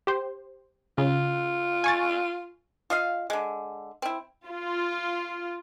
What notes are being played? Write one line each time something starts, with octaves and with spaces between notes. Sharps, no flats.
G4 C5
C#3 F4
G#5 C#6 A6
F4 D#5 F5
D3 G#3
C4 E4
F4